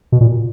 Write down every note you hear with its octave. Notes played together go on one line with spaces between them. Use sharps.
B2
A#2